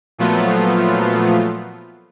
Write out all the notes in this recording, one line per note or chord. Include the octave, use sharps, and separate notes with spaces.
A#2 F3 F#3 A3 B3 F4